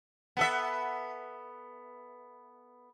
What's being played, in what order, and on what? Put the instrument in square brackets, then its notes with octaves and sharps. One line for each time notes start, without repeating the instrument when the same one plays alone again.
[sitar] B3 A4 E5